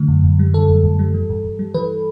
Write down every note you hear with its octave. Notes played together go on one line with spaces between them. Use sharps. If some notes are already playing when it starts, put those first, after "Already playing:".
Already playing: D3 A3
F#2
F#2
G3
D3 A4
F#2
F#2
G3
E3
G2
G2
G3
E3 B4